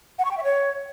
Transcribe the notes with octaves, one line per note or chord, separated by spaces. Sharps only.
F#5
C#6
G5
E5
C#5